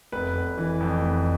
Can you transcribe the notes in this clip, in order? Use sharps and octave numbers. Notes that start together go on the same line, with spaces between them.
F1 B4
F1
E3
F2
F1